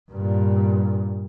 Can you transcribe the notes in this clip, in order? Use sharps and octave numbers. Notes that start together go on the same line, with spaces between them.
G2 A#2